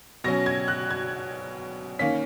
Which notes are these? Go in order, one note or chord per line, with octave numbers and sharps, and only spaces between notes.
B2 F#3 C#4 A#6
G#6
F#6
G#6
D#3 A#3 C#4 B6